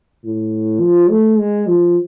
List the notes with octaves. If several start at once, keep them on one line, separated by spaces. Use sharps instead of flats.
A2
F3
A3
G#3
F3